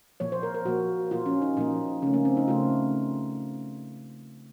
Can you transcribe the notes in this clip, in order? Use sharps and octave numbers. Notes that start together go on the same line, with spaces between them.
A#2 F3 A#3 C#5
C5
A#4
A#4
A#2 F3 A#3 F#4
A#2 F3 A#3 F4
C#4
D#4
A#2 F3 A#3 D#4
C#3 A3 C#4
A#3
C4
D#4
C#3 A3 F4